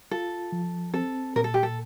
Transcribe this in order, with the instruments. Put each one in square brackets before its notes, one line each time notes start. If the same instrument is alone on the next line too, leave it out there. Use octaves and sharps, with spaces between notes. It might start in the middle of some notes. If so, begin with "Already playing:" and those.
[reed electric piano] F4 [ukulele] A4
[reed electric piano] F3
[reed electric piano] C4 [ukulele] A4
[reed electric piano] A#2 [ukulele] A#4
[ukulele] A4
G4
A4